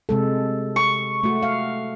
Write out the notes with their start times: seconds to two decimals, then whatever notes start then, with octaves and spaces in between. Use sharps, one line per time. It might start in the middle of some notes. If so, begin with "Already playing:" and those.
0.09 C3 G#3 A4
0.76 C#6
1.23 A3 F#4
1.43 F5